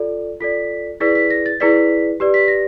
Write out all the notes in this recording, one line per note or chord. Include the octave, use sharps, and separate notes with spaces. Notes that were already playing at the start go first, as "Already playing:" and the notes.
Already playing: F4 A4 D5
F4 A4 D5 B6
E4 G#4 B4 D5 B6
B6
A#6
A6
E4 G#4 B4 D5 B6
G4 B4 D5
B6
A#6